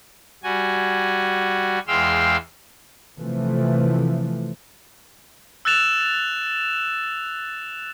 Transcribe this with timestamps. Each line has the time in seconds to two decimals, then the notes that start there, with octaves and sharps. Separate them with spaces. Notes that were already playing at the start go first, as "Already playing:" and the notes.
0.44 G3 F#4 G#5
1.87 E2 G#3 F5 G5 C6 E6
3.19 C3 E3 F3 A3
5.65 E6 F#6 A6 E7 F7